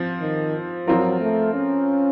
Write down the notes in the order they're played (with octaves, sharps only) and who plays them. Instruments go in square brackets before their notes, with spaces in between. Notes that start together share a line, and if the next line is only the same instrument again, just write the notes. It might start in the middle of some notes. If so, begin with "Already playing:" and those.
Already playing: [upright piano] F3 C4
[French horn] D#3
[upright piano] F3 C4 F4 A#4 [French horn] F#3
[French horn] A3
C#4